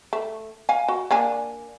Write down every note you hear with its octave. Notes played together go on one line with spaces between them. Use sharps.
A3
F5 G#5
F#4
A#3 D4 G#5